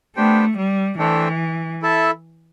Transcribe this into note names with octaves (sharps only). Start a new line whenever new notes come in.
A3 B3 D4 G4 C5 G5
G3
E3 A3 D4 A4 C5 G5
E4 A4 E5 A5